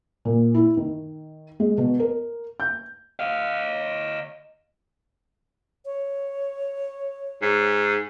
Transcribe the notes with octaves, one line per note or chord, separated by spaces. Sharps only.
A#2
E4
D#3
G#3
B2
A#4
G6
D#5 F5
C#5
G#2